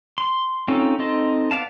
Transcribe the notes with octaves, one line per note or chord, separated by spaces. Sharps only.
C6
C4 C#4 D#4 F4 A4
C4 D#4 A4 D#5 C6
B3 D5 F5 A5